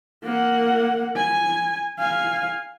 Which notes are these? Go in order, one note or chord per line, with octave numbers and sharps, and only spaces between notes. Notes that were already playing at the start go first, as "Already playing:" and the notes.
A#3 F#5
G#5
F5 G#5